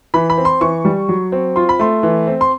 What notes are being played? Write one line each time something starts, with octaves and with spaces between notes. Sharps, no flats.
E3 B5
B5
C4
C6
E3 C#6
G3
F#3
C4
F4 C6
B5
A3 C6
E3
C4
C6